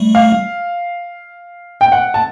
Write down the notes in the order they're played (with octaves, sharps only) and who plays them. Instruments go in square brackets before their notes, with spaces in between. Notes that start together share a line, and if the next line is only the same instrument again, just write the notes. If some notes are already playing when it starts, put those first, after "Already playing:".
Already playing: [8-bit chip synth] G3 A3
[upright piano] F5
G5
F#5
A5